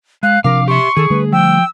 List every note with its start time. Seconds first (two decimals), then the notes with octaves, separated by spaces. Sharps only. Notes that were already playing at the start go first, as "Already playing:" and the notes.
0.23 G#3 F5 F#6
0.44 C3 F3 D4 A#4 F5 D6
0.68 G4 E5 C6 C#6
0.97 D#3 G#4 A4
1.10 D3 G3 A3 B4
1.32 F3 G5 E6